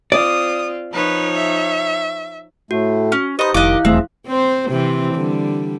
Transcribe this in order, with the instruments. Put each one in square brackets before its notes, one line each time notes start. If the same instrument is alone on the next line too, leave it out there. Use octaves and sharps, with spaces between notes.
[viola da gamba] C4 F4 [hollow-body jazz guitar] D5 [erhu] D#6
[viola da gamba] F3 D#4 C#5 [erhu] B4
[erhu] E5
[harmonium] A2 A3 [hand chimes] F#4
[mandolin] C#4
[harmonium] D#4 B4 C5 [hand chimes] G4 [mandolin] D#5 D#6
[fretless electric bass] F1 [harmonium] D#3 [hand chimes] E4 F5 F#6 [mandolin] D#5 D6
[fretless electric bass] D#1 E2 A3 [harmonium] F3 G#4 E5 [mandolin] C4
[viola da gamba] C4 C5
C3 E3 C4
D3 G3